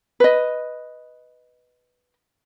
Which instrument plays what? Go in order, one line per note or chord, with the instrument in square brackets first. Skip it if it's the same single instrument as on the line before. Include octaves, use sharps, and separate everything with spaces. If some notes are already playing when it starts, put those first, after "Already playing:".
[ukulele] B4 D#5